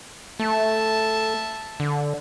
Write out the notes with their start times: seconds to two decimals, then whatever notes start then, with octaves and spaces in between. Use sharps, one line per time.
0.39 A3 E5 A5
1.80 D3